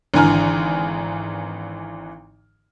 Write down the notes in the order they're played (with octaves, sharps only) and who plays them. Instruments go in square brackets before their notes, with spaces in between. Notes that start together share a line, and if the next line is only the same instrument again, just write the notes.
[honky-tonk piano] G#1 D3 E3 G#5 A#5 F6